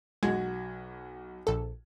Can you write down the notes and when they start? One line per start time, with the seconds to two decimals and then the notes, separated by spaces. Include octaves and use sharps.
0.23 B1 G#3 F#4 G#6
1.47 A#1 A4